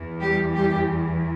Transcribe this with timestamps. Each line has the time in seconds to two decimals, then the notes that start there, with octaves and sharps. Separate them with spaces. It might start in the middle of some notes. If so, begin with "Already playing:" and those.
Already playing: E2 E3
0.21 G3 G4
0.55 G3 G4